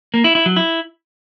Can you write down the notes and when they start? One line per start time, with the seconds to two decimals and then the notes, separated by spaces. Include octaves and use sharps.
0.14 A#3
0.24 E4
0.35 E4
0.46 F#3
0.57 E4